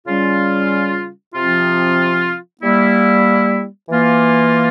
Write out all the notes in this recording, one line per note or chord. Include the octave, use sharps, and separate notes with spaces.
C#3 G3 C#4 F4
C3 F3 C4 F4
G3 A#3 E4
E3 A#3 F4